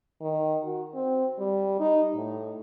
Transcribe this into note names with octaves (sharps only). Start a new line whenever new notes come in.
D#3
F#4
C4
G3
D#4
A2